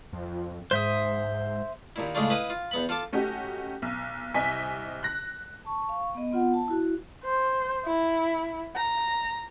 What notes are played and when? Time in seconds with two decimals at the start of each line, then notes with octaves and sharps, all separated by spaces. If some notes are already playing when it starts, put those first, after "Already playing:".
0.13 F2
0.71 G#2 C5 E5 D#6
1.96 D#2 A#2 E4
2.15 A2 C#3 G#3 A3 D4 F4
2.30 E4 B4 D#5 F5
2.50 F4
2.71 E2 B3 B5
2.89 F4 A4 F5 D6
3.13 A3 C#4 D#4 F#4 G4
3.82 B1
4.34 C2 C3 D#5 G#5 B6
5.03 F#6 A#6
5.65 A5 C#6
5.89 F5 C#6
6.15 B3 D#5
6.31 B3 C4 F4 F#5
6.53 A5
6.68 E4 F#4
7.24 C5
7.86 E4
8.76 A#5